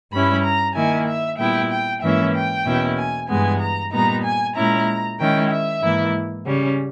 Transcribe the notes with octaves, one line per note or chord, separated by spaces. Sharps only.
G2 G3 C#4 E4 B5
A#5
D#3 A#3 E4 G#5
E5
A#2 G3 B3 E4 G5
G5
G#2 E3 A#3 C#4 E4 E5
G5
E2 B2 A#3 C#4 E4
G#5
G2 E3 G#3 B3 G#5
A#5
A#2 G3 B3 D#4 A#5
G#5
A#2 G#3 C#4 E4 A#5
D#3 G#3 C#4 E4 G5
E5
G#2 E3 A#3 E4
C#3 G3 C#4